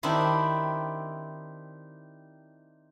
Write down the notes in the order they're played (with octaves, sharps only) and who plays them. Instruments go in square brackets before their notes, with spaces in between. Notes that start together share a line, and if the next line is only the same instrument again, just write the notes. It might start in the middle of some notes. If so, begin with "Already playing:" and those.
[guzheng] D#3 C4 D4 E4 G4